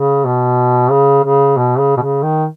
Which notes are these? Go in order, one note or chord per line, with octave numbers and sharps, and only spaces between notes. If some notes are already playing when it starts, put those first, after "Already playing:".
Already playing: C#3
B2
C#3
C#3
B2
C#3
B2
C#3
D#3